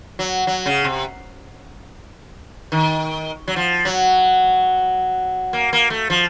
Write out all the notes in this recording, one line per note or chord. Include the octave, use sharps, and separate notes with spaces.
F#3
F#3
C#3
C3
D#3
F#3
F3
F#3
A#3
A#3
A3
F3